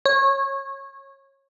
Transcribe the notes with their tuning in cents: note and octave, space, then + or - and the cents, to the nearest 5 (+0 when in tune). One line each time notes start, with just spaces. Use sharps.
C#5 -25